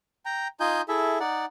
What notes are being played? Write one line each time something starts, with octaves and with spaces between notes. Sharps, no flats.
G5 A#5
D#4 F4 D#5 G#5 G6
E4 G#4 A4 E5
D#4 D5 F#5